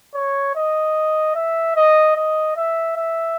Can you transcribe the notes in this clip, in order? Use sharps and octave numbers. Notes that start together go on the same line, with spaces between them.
C#5
D#5
E5
D#5
D#5
E5
E5